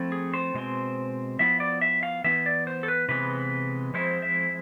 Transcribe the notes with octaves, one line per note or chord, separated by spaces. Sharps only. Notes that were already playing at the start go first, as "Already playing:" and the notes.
Already playing: F3 A3 C4 E4
G#4
C5
B2 G#3 C4
F3 B3 E4 E5
D5
E5
F5
E3 B3 E4 E5
D5
C5
A4
B4
C3 E3 G#3 B3 B4
F3 G#3 C4 E4 C5
E5